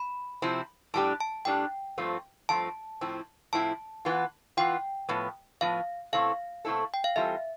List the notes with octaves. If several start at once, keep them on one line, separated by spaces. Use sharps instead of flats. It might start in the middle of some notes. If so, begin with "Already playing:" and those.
Already playing: B5
C3 F3 C4 E4
A2 G3 D4 G4 A5
A5
A2 G3 D4 G4 G5
G2 F3 A3 C4 F4
G2 F3 A3 C4 F4 A5
A2 F3 C4 E4
A2 F3 C4 E4 A5
E3 B3 F4
E3 B3 F4 G5
A2 F3 B3
A2 F3 B3 F5
B2 A3 C4 E4 A4 F5
B2 A3 C4 E4 A4
G5
F5
E3 G3 C4 F4 A4 E5